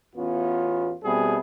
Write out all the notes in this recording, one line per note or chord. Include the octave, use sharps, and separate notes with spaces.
A1 E2 B3 C#4 F4
B2 G3 A3 B3 C4 G#4